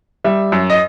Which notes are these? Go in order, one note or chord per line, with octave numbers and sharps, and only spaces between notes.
G3 E5
F#2
D#5